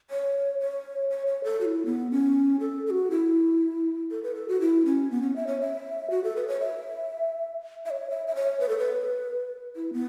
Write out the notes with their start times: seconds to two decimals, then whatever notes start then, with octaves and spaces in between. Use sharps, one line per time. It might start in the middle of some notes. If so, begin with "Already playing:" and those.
0.10 C#5
0.60 C#5
1.10 C#5
1.27 C#5
1.44 A4
1.61 F#4
1.65 E4
1.86 B3
2.11 C#4
2.60 A4
2.86 A4
2.90 F#4
3.11 E4
4.11 A4
4.24 B4
4.35 A4
4.48 F#4
4.61 E4
4.85 C#4
5.11 B3
5.22 C#4
5.36 E5
5.47 C#5
5.61 E5
6.10 F#4
6.24 A4
6.36 B4
6.48 C#5
6.60 E5
7.86 E5
7.90 C#5
8.10 E5
8.27 E5
8.35 C#5
8.60 B4
8.69 A4
8.78 B4
9.76 E4
9.93 B3